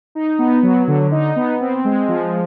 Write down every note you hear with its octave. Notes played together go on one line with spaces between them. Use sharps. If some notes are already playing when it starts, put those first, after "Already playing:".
D#4
B3
F#3
D3
D#4
B3
C4
G#3
F3